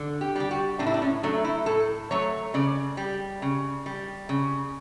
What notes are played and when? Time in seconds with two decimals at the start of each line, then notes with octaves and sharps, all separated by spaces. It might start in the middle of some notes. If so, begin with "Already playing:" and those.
Already playing: D3
0.21 G4
0.36 G3 G4
0.51 F#4
0.79 A2 D4
0.87 E4
0.94 D4
1.02 C#4
1.23 F#3 A3 D4
1.45 E4
1.66 A2 A4
2.11 F#3 A3 C#5
2.54 C#3 D5
2.97 G3
3.42 C#3
3.86 G3
4.29 C#3